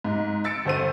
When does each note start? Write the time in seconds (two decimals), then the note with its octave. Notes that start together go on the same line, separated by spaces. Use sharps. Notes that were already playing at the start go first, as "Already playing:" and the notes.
0.04 G#2
0.44 E6 A6 C#7 D7
0.65 G1 C5 D#7